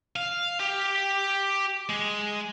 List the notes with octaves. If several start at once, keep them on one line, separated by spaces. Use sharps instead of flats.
F5
G4
G#3